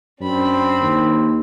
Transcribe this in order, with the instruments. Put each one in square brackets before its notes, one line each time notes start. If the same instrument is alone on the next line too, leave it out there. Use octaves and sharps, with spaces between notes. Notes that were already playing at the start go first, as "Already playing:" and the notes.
[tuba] F#2 [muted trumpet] C4 [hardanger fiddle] D4 B5
[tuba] D#2